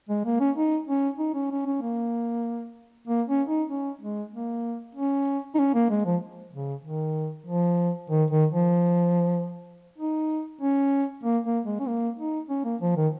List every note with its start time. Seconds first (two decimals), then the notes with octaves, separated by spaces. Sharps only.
0.10 G#3
0.25 A#3
0.40 C#4
0.57 D#4
0.88 C#4
1.19 D#4
1.35 C#4
1.51 C#4
1.66 C#4
1.82 A#3
3.08 A#3
3.28 C#4
3.49 D#4
3.70 C#4
4.01 G#3
4.34 A#3
4.95 C#4
5.55 D#4
5.59 C#4
5.75 A#3
5.90 G#3
6.06 F3
6.53 C#3
6.85 D#3
7.47 F3
8.10 D#3
8.31 D#3
8.52 F3
9.98 D#4
10.61 C#4
11.24 A#3
11.45 A#3
11.65 G#3
11.80 C#4
11.87 A#3
12.18 D#4
12.50 C#4
12.65 A#3
12.81 F3
12.97 D#3